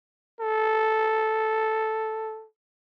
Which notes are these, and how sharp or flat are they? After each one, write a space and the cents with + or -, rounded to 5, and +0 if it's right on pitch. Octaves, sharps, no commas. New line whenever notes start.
A4 -5